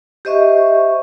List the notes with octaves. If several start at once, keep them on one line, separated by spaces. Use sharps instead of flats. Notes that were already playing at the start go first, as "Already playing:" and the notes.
G4 C5 D#5 E5 C#6